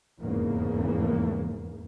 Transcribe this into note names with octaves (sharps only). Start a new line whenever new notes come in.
F1 E2 G#2 C#3 A#3